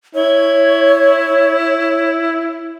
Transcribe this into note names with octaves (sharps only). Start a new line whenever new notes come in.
E4 C#5